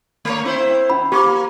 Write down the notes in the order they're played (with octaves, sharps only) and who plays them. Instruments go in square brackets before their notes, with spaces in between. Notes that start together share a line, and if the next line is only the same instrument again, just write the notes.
[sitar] A3 A#3 C#5
C4 E4 C5
[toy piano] C#4 B5
[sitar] A#3 [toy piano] G4 C#6 D6